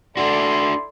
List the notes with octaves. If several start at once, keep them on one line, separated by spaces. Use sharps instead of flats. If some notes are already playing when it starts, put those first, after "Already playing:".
D4 E4 F#4 A4 D5 C6